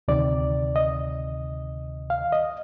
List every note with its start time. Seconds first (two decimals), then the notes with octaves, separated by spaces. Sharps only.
0.08 D2 C3 D#3 D5
0.76 D#5
2.10 F5
2.32 D#5